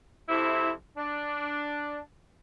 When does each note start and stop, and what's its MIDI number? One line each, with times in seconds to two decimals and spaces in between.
0.29 0.71 41
0.29 0.71 48
0.29 0.71 64
0.97 1.98 62